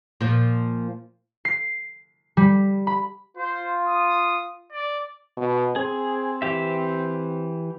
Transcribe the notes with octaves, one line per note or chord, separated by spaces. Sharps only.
A#2 F3
C7
G3
B5
F4 C5
D#6
D5
B2
C4 G#4
E3 G4 E5